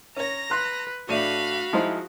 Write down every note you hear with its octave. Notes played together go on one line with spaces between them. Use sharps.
C#4 C#5 A#5 A#6
B4 C6 F#6
A2 A3 D4 F#4 F5 B5 D#7
F3 G#3 D#4 E4 C5